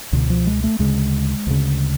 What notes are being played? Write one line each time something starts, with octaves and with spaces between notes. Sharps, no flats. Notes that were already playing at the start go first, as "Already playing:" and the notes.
C#2 B2 D3
F3
G#3
A3
D2 C#3 G#3
D2 C#3